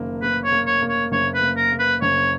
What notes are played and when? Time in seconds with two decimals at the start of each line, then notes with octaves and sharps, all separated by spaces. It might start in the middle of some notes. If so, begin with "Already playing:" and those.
Already playing: F#1 D#3 A#3
0.22 A#3 B4
0.44 C#5
0.52 A#3
0.67 C#5
0.82 A#3
0.89 C#5
1.12 F#1 C#5
1.35 B4
1.42 A#3
1.57 A#4
1.72 A#3
1.79 B4
2.02 F#1 C#5